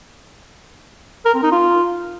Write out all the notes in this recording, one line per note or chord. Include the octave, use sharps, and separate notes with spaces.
A#4
C4
D#4
F4